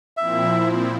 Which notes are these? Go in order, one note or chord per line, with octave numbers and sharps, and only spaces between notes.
A#2 F3 C4 E4 E5